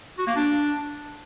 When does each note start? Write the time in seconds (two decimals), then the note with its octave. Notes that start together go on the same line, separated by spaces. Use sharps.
0.19 F#4
0.27 A#3
0.36 D4